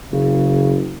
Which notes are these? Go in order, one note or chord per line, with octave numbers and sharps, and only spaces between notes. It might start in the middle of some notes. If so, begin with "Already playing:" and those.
F#1 C#3